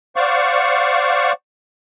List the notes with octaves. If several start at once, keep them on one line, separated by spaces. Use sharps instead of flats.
C5 D5 F5 F#5 C#6